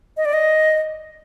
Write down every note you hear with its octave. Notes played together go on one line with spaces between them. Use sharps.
D#5
D5
D#5